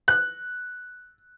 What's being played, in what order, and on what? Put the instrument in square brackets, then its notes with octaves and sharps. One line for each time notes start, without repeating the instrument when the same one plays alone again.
[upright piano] F#6